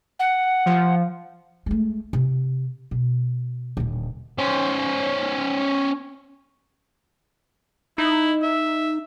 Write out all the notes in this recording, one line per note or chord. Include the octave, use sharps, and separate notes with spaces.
F#5
F3
G#3 A3
C3
B2
D#1 D3
C#4 C5
D#4 E4
E5